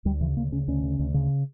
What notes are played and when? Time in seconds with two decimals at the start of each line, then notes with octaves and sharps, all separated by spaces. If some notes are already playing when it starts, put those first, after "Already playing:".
0.05 D2 G3
0.21 C#3 E3
0.37 D2 A#3
0.52 C#3 C#4
0.68 D2 C#4
0.83 C#3
0.99 D2
1.14 C#3